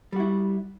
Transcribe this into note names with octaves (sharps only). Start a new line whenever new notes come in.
G3 E4 F#4